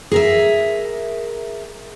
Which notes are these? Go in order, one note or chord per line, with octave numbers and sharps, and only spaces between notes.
G#4 A#4 E5